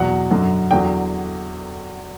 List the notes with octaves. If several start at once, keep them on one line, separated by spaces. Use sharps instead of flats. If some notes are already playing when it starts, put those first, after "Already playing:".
Already playing: E2 B2 F#3 F#5
F#2 D3 F#3
E2 D3 F#3 G5